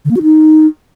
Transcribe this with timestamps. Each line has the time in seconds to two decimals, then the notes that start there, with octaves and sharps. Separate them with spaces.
0.05 D3
0.11 A#3
0.17 F#4
0.22 D#4